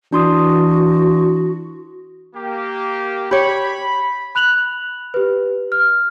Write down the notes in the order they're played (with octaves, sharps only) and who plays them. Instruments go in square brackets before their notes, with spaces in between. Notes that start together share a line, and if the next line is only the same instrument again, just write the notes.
[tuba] E3 [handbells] D4 C6 D#6 [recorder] F#4
[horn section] A#3 G4
[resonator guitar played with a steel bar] G4 C#5 [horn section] B5
[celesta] B5 F#6 F7 F#7
G4 B4
F6